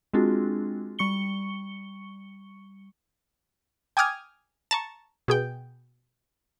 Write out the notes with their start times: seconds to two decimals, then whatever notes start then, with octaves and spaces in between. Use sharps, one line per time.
0.13 G#3 C4 D4 F4 F#4 G#4
0.99 G3 C#6 C#7 G7
3.97 G5 G#5 D6 D#6 F6 G#6
4.71 A5 A#5 C#6
5.28 B2 G#4 G5